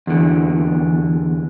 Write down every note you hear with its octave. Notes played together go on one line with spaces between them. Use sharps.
E2 D3